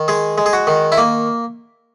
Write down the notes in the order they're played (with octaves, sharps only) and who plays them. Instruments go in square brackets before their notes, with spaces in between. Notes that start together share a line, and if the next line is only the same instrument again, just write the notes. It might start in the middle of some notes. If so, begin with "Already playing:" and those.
Already playing: [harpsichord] D#3
G#3 G#4
G#3
G#4
F#4
D#3
E4
A#3